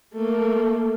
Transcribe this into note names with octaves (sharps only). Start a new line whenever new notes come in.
A3 A#3